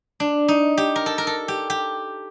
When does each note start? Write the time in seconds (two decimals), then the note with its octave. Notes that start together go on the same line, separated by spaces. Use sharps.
0.20 D4
0.48 D#4
0.78 G4
0.96 A#4
1.06 A4
1.18 A#4
1.27 A4
1.48 G4
1.70 G4